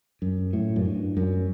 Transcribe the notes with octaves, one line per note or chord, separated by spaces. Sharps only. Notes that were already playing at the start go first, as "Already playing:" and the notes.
F#2
A2
F#2
G2
F#2